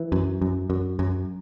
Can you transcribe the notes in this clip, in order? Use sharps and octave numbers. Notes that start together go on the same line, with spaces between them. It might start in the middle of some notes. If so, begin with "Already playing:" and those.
Already playing: E3
F#2
F#2
F#2
F#2